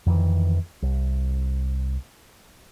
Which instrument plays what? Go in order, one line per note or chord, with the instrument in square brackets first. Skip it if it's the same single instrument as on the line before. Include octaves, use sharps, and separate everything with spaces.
[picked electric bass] F2 D#3 E3
C2